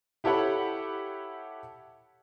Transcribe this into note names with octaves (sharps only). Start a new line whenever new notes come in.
E4 G4 A4 C#5 F#5 B5